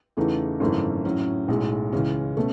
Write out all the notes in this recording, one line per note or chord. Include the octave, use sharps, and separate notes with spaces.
E2 C#3 E3 A3 D#4
G#1 F#2 C#3 E3 A3
A2 F#3 C#4
B1 A2 G#3
C#2 C#3 E3 G#3 C#4
B2 A3 C#4